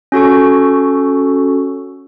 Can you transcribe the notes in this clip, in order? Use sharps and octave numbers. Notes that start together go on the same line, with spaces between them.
C#4 F#4 A4 C#6